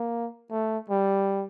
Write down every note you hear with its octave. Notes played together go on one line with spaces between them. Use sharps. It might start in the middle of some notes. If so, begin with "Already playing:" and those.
Already playing: A#3
A3
G3